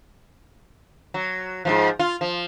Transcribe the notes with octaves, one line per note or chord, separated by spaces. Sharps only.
F#3
G#2 B2 F3
F4
F3